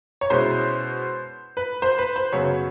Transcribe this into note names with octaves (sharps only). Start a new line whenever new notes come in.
C#5
B2 G#3 C#4 E4 C5
B4
C5
B4
C5
F#2 C#3 F#3 B3 C#5